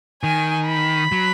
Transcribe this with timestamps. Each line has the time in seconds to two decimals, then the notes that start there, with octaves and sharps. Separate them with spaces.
0.23 D#3 G#5
0.68 B5
1.12 F#3